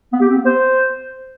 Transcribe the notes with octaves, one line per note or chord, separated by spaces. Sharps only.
B3
G4
C4
B3
C5